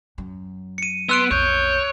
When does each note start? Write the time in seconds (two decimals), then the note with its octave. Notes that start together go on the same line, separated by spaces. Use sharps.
0.18 F#2 F#3
0.78 C#7 D#7
1.09 B3 C6 E6 F#6 D7
1.31 B1 F2 C#5 G6